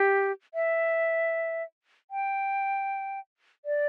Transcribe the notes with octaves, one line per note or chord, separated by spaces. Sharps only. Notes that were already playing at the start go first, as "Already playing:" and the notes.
Already playing: G4
E5
G5
D5